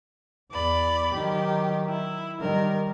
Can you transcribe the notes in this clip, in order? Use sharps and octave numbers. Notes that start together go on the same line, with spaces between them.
E2 D5 B5
D#3 F#3 G4
E4
D#3 G3 A#4